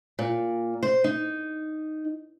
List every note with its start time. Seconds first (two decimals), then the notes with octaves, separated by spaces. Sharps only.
0.19 A#2
0.83 C5
1.04 D#4